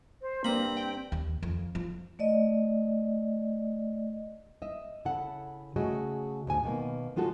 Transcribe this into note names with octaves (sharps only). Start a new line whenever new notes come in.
C5
G2 A#3 C4 A#5 B5
G5
D#2
F2
F3
A3 D5 D#5
D#5 E5
C#3 E4 A4 F#5
C#3 A3 F#4 G#4 D#5
D2 A2 G#5
B2 D#3 A#3 B3
F3 G#3 F4 F#4 A4